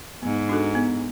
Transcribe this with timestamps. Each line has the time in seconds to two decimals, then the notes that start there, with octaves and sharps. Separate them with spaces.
0.23 G#2 B3
0.49 D4 F#4 A4
0.75 B3